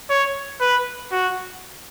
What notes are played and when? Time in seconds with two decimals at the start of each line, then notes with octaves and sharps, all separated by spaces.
0.10 C#5
0.61 B4
1.12 F#4